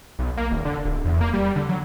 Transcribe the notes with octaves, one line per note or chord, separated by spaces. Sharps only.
B1
A#3
D#1
D3
D1
E2
A#3
G3
D3
F#3